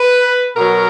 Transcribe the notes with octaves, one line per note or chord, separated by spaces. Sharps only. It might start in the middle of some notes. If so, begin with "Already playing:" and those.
Already playing: B4
B2 F#3 A#4